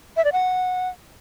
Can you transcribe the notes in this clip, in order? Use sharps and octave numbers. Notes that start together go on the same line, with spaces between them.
E5
D5
F#5